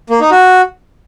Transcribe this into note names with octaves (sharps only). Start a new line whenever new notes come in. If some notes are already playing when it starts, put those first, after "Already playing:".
A#3
D#4
F#4